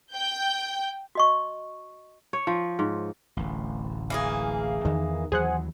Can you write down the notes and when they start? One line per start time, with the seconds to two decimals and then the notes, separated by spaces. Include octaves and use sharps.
0.13 G5 G6
1.15 F#4 D#5 C#6
2.33 C#5
2.47 F3
2.79 G#2
3.37 D1 A1
4.10 E3 A#3 G#4 F5
4.85 E2 D#3
5.32 D#2 E3 F#3 G#4 C5 F#5